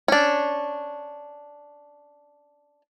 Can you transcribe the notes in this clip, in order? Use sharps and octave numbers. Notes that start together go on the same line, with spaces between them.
C#4 D4